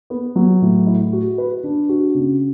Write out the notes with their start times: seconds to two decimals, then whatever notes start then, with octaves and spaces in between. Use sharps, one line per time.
0.10 B3
0.35 F#3
0.62 A2
0.86 E4
1.13 F#4
1.38 B4
1.64 D4
1.89 F#4
2.15 C#3